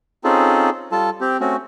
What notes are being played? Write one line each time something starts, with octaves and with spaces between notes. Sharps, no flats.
C4 C#4 D#4 F4 G#4 A4
G3 F4 A4 A5
C4 G4
A3 C4 C#4 F#4